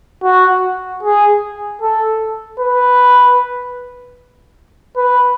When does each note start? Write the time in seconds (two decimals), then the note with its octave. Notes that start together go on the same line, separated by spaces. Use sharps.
0.23 F#4
1.03 G#4
1.82 A4
2.60 B4
4.96 B4